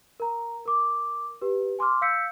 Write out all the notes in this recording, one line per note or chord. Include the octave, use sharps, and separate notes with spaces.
A#4 A#5
A#4 D6
G4 B4
G#5 C6 D6 F6
F5 E6 G6 B6 C#7